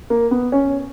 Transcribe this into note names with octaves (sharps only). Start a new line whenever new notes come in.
A#3
B3
C#4